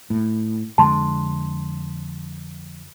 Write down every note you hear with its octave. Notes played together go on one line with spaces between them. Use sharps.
A2
F2 D3 G#3 A5 C6